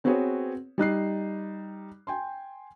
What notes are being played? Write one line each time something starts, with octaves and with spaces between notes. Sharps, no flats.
B3 C4 F#4 G#4 B4 C#5
G3 D#4 F#6 C7
G5 G#5 C6